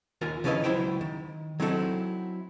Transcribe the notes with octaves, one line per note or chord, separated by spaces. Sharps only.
D#2 D#3 F4 A#4 G#5
C#3 F3 C#4 E4 B4 D#5
C#2 F#3 E4 C5 G5
D#3
F#3 C4 D#4 E4 F#4 A4